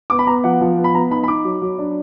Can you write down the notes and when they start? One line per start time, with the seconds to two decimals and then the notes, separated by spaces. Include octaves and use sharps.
0.10 B3 D6
0.19 B5
0.27 B3 A#5
0.44 F3 F#5
0.61 F3
0.78 B3
0.84 B5
0.94 B3 A#5
1.11 D#4 B5
1.23 B5
1.28 D#4 D6
1.44 F#3
1.62 F#3
1.78 D4